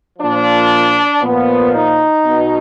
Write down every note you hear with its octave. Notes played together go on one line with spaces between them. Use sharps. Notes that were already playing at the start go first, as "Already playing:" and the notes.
A#2 F3 D4
A#2 F3 B3
D#4
B2